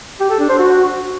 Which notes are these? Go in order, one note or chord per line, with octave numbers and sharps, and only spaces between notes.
G4
A4
D4
C5
F#4